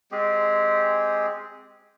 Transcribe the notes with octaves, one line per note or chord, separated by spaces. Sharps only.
G#3 C4 G4 G#4